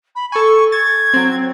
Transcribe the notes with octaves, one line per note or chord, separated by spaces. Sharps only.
B5
A4 G#5 C#6
G#6 A6
F#3 C4